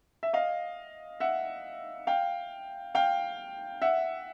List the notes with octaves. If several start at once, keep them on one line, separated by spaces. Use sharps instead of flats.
E5
D#5 F5
E5 F#5
F5 G5
F5 G5
E5 F#5